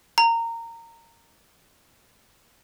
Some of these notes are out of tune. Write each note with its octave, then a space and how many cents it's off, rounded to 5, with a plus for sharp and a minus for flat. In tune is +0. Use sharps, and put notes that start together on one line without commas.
A#5 -20